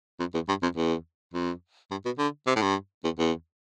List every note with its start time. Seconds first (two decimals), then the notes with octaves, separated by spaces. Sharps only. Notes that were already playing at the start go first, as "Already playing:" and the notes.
0.19 F2
0.34 E2
0.48 G2
0.62 F2
0.76 E2
1.33 F2
1.91 G2
2.05 B2
2.18 D3
2.47 C3
2.56 A2
2.62 G2
3.04 E2
3.19 E2